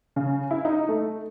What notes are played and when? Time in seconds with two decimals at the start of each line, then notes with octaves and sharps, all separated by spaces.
0.16 C#3
0.51 E4
0.65 D#4
0.89 A3